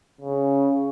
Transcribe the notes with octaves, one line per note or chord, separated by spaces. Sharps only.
C#3